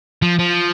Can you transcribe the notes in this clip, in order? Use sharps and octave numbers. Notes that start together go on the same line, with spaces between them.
F3
F3